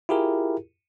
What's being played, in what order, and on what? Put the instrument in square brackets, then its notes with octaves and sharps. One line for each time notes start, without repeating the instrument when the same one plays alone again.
[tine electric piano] E4 F4 G4 G#4 A#4